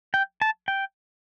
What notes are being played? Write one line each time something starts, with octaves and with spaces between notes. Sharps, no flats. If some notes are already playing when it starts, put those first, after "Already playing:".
G5
A5
G5